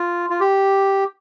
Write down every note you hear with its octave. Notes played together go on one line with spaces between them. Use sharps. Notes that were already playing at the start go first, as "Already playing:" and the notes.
Already playing: F4
F4
G4